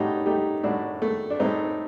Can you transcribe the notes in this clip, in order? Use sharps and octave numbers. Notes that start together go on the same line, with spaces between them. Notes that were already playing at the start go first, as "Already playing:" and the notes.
Already playing: A2 D#4 F#4 G4
A3 D#4 G4
A2 D4 F#4
A3
D4
A2 C4 D#4